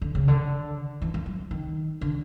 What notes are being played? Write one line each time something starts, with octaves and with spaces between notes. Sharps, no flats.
D3
C#3
D3
E3
F3
F#3
D#3
D3